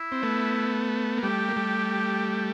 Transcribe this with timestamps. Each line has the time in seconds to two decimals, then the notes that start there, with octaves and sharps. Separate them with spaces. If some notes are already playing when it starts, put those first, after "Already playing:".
Already playing: E4
0.12 C4
0.22 A3 B3
1.18 A#3
1.23 G3 A3 G4
1.49 A#3
1.56 G3 A3